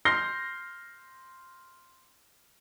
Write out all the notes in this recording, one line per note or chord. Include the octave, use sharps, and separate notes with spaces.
C6 F6 G6 A#6 C7 G7